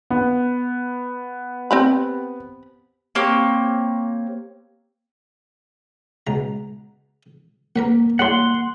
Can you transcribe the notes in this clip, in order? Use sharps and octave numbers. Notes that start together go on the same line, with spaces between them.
B3
C4 G4 B5
A#3 C4 G4 C#5
C#2 B2 A#5
A#3 A#4 B4 F#5
F#3 G3 A#3 E4 F#5 C6